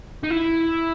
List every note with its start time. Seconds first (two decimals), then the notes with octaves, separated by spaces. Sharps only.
0.23 D#4
0.30 E4